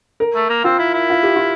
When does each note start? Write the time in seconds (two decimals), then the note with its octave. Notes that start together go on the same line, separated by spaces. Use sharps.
0.20 A#4
0.35 A3
0.49 A#3
0.64 C4 F4
0.79 E4
0.94 E4
1.10 F4
1.23 G4
1.36 F4